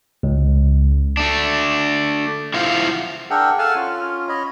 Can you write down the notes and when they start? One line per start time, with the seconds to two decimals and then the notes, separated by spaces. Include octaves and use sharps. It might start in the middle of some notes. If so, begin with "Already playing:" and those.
0.23 C#2
1.17 A3 D4
2.54 E4 F4 C5 F5 F#5
3.30 D4 G#4 A#4 E5 F#5 G5
3.58 A4 F5 F#5 G#5 A5 F6
3.75 C#4 F4
4.29 C#5 D#5 B5